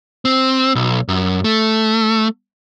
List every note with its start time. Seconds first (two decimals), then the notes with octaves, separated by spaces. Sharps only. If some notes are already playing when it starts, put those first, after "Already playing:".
0.25 C4
0.75 B1
1.08 F#2
1.44 A3